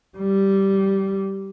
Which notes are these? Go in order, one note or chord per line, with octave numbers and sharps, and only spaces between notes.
G3